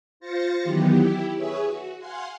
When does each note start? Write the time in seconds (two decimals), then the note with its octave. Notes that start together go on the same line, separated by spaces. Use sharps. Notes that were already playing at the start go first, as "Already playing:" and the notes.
0.20 F4 C5 A6 A#6 C#7
0.63 D#3 E3 F#3 B3 G4
0.97 E4 G4
1.34 G#4 B4 C#5 E5
1.66 F#4
1.98 F5 F#5 G#5 C6